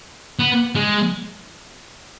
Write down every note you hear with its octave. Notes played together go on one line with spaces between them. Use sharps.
B3
G#3